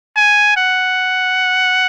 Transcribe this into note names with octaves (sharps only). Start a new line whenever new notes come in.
G#5
F#5